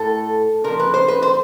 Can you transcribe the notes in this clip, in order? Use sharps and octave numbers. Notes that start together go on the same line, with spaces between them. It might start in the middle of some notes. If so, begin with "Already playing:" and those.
Already playing: A2 A4
A#2 F3 A#4
B4
C5
B4
C5